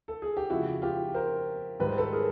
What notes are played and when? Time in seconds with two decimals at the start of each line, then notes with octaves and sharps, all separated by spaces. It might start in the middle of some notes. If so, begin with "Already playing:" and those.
0.08 A4
0.22 G#4
0.37 G4
0.50 F2 C#3 F3 G#3 E4 F#4
0.82 F4 G4
1.14 A#4 C5
1.79 G#2 D#3 G3 B4
1.89 C5
1.98 A4 B4
2.13 G#4 A#4